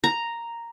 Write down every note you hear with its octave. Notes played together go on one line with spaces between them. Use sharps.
A#5